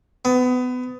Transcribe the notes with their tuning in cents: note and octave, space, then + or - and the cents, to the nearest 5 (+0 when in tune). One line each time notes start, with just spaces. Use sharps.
B3 +25